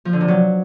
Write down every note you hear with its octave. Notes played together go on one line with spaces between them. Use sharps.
F3
D3
C3
F#3